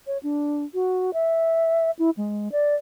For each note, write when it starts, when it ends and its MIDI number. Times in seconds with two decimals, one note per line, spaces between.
0.07 0.18 73
0.23 0.64 62
0.74 1.11 66
1.14 1.91 76
1.99 2.10 64
2.17 2.49 56
2.52 2.75 74